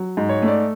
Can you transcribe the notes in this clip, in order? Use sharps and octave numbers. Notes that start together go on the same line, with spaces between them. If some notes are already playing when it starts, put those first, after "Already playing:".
Already playing: F#3
G#2
C#5
A3
D5